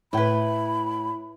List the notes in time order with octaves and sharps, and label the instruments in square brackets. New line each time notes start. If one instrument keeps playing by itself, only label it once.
[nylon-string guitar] A2 G5 [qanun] E4 B4 [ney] B5